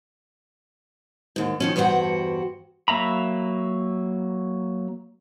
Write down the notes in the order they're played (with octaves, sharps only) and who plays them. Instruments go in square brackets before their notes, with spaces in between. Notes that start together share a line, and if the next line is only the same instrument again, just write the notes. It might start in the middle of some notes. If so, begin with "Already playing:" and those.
[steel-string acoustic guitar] D#2 G#2
D#3 F3 C#4
E2 G2 F#4 C5 F#5 G5
[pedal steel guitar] F#3 A#3 E5 A#5 B5